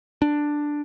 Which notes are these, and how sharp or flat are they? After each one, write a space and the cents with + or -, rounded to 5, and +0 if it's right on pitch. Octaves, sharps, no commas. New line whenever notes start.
D4 +5